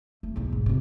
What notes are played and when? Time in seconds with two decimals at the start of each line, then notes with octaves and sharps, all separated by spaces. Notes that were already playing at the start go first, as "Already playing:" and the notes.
0.23 A3
0.36 B1 E2
0.52 G#2
0.66 C#2 C3